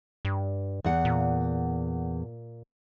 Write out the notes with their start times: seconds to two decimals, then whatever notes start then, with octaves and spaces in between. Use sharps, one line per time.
0.25 G2
0.84 E2 F#5
1.05 A#2